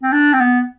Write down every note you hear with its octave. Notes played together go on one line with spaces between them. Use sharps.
C4
D4
C4
B3